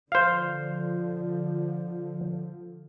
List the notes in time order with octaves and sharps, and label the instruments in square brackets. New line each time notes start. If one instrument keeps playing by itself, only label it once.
[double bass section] D3 F3 [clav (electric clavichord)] C5 F5